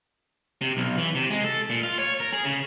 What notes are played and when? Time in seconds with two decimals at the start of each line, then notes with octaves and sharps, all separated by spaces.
0.61 C3
0.77 B1
0.97 E3
1.15 C3
1.30 G#3
1.44 A4
1.70 A#2
1.83 F4
1.99 C#5
2.20 A#4
2.33 G#4
2.45 C#3